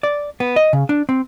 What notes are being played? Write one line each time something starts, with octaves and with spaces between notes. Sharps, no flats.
D5
B3
D#5
C#3
D4
C4